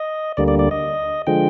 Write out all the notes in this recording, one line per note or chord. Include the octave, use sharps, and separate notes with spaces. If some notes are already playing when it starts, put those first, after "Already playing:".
Already playing: D#5
D2 D3 G3 A#3 D5
D5
D5
D#5
D3 F3 G#3 G5